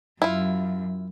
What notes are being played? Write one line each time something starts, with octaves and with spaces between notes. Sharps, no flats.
F#2 E4 F4